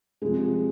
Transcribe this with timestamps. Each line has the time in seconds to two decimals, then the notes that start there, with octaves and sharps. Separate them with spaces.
0.22 C3 F3 G#3